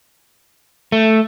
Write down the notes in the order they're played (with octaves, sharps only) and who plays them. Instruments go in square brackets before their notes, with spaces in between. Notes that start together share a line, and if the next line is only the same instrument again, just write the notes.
[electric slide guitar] A3